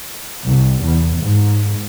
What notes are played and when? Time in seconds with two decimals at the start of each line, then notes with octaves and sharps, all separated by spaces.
0.45 C2
0.82 E2
1.21 G#2